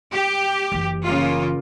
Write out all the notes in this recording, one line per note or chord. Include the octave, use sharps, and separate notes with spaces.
G4
F#1 E3
C#3 A#3 F4